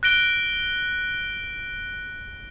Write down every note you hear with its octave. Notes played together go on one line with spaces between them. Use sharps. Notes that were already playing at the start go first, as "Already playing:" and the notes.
F#6 A#6 D7 G7